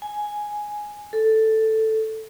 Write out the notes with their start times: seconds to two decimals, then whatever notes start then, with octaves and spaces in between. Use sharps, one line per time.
0.02 G#5
1.13 A4